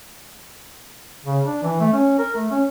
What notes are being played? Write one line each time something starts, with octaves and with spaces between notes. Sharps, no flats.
C#3
D4
E3
A3
C#4
A#4
A3
C#4